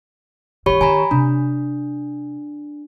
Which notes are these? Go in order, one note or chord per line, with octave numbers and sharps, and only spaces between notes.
D#3 F4 G4 C#5 B5
D#3 G#5 A#5 B5
C3 D4